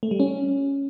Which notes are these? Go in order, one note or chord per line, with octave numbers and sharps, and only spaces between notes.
A3
G3
C#4